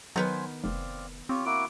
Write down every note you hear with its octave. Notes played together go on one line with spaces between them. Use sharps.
D#3 F#3 B3 B4 C5 G#5
F1 C4 D5 F5
C4 F4 G4 C#5
A#3 E4 F#4 D6